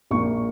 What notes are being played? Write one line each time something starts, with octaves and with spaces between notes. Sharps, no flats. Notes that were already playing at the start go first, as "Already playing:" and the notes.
A#1 A#2 A#3 C#6